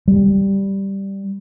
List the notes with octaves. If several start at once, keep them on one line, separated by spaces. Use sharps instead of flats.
G3